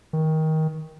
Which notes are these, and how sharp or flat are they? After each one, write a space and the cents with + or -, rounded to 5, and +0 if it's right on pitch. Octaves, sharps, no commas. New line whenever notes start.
D#3 +20